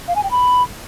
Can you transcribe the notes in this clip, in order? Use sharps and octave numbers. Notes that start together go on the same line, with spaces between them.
F5
G#5
G5
B5